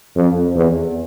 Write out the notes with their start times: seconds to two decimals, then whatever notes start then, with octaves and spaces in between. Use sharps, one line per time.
0.16 F2
0.56 E2